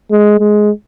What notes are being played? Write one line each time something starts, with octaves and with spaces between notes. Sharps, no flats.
G#3
G#3